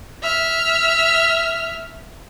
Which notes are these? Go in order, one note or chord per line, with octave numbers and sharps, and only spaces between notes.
E5 F6